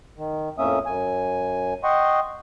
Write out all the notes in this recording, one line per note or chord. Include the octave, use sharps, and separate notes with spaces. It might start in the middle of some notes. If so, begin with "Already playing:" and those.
D#3
F2 A2 A#3 C#4 E5 D#6
F#2 G#5
D#5 F#5 G5 C6 C#6